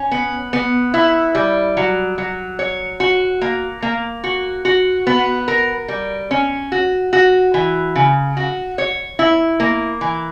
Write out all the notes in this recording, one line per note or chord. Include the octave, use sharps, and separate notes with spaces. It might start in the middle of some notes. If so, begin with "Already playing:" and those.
Already playing: C#4
B3
B3
E4
G3
F#3
F#3
C#5
F#4
A#3
A#3
F#4
F#4
B3
A#4
G3
C#4
F#4
F#4
E3
C#3
F#4
C#5
E4
A#3
E3